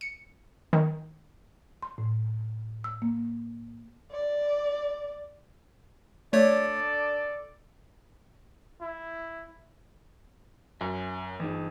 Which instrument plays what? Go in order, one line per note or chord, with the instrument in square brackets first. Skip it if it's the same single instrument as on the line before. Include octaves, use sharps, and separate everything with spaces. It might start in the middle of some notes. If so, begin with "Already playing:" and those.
[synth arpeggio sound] C#7
D#3
[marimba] C6
A2
E6
A#3
[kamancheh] D5
[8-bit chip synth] A3 C#5 [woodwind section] D4 A4 D5
[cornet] E4
[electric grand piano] F#2 [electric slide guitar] E5 G#5
[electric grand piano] G1 [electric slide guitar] E3 D#4 G#4